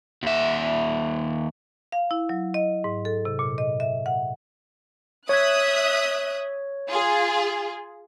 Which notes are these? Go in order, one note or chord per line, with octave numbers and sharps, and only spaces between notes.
D#2 E5
F5
E4
F#3
D#5
G#2
A4
C3
A#2
D#5
E5
F#5
C#5 E5 D#6 F#6 G#6
F4 G#4